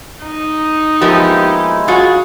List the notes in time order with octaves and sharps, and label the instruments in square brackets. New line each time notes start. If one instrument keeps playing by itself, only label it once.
[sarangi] D#4
[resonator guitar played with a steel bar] F3 A#3 B3 [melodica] G#3 E4 [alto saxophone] G4
[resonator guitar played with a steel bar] F4 G#4 [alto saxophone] F#4